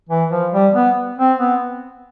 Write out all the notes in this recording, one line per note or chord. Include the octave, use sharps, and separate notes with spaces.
E3
F3
G3
B3
C4
B3